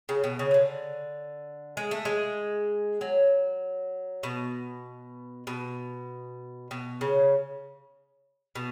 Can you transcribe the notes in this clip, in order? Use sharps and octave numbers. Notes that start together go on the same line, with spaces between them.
C#3
B2
C#3
E3
D3
G#3
A3
G#3
F#3
B2
B2
B2
C#3
B2